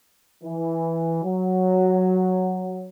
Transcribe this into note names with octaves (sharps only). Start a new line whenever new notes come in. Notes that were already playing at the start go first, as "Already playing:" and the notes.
E3
F#3